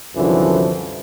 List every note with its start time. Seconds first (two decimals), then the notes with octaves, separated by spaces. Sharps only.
0.16 C2 F#2 D3 E3 F3